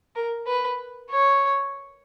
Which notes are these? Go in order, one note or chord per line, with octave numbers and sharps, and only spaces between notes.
A#4
B4
C#5